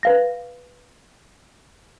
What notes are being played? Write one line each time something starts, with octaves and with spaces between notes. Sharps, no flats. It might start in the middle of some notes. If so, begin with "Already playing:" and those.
B4 F5 A#6